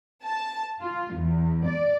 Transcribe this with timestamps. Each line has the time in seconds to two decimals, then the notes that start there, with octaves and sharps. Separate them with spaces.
0.23 A5
0.80 F4
1.15 E2
1.65 D5